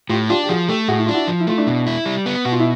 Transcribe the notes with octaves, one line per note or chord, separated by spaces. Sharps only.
A2 F4 G4
D4 F4 G4
G4
F3 F#4 G#4
A3 G4 A4
A2 F#4 G#4
E4
D4 F4
E4 F#4
F3
E4
A3 F4
D4 E4
B2
E4
G3
B3
B2 F#4
F4
E4